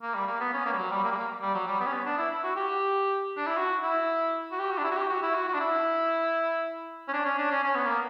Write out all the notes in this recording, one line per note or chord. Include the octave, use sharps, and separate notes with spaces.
A#3
G3
A#3
B3
C#4
A#3
G3
F#3
G3
A#3
G3
A#3
G3
F#3
G3
B3
C#4
B3
D4
E4
E4
F#4
G4
D4
E4
F#4
E4
F#4
G4
F#4
D4
E4
F#4
G4
F#4
E4
F#4
F#4
D4
E4
C#4
D4
C#4
D4
C#4
C#4
B3
A#3